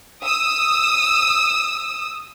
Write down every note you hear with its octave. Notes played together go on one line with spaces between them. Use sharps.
D#6 E6